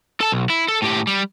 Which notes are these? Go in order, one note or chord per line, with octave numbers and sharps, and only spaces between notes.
A4 A5
B1
E4
A4
A2 G4
G3